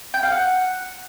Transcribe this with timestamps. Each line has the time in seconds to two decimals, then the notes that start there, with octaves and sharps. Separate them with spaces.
0.14 G5
0.23 F5
0.32 F#5